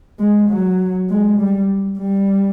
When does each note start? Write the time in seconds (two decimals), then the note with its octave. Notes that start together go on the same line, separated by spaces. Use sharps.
0.19 G#3
0.49 F#3
1.10 G#3
1.40 G3
1.99 G3